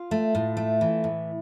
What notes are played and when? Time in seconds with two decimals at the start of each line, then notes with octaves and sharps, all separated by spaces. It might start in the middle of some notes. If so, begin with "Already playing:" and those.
Already playing: F4
0.11 A3
0.35 A2
0.57 A3
0.81 E3
1.04 A2